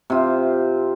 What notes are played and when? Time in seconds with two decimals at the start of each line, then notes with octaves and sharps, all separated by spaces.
0.10 C3 F4